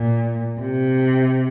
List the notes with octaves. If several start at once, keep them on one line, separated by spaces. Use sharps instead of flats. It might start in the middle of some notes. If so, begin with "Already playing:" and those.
Already playing: A#2
C3